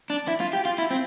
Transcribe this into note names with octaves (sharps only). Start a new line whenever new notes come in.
D4
E4
F4
G4
F4
E4
C4